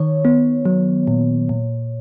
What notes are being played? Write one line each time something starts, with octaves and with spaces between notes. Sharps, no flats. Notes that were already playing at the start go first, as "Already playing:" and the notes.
Already playing: D#3 C#5
B3
F#3
A#2
A#2